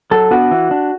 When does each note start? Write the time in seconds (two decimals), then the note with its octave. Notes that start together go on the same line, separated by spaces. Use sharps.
0.11 F#3 A4
0.31 B3 D4 F#4
0.51 E3
0.71 D4